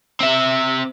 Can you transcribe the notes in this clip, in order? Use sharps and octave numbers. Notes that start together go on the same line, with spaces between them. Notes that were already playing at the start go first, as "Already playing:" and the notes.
C4 E5